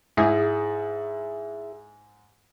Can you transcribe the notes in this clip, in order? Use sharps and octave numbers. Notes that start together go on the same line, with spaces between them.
G#2 E4 G#4